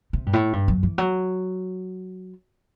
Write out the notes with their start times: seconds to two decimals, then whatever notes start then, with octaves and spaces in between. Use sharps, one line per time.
0.13 C3
0.26 G2
0.33 A2
0.53 G2
0.68 F#2
0.83 E3
0.98 F#3